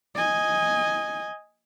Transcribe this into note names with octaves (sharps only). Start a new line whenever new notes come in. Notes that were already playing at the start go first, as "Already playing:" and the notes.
D#5 G#5